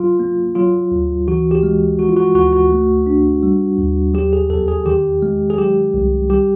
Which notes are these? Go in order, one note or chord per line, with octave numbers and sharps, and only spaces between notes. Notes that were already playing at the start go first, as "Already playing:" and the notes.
Already playing: F#3 F4
A#3
F#3 F4
D2
E3 F#4
G4
G#3
F3 F#4
F4
F#4
D2 F#4
F#4
A3
D4
G3
D#2
F#3 G4
G#4
E2 A4
G#4
D#3 G4
G#3
G#4
F#3 G4
C2
G3 G4